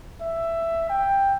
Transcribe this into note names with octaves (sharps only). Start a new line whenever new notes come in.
E5
G5